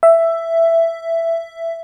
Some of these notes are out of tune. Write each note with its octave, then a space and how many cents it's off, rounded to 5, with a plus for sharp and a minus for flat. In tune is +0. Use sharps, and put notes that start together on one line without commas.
E5 +10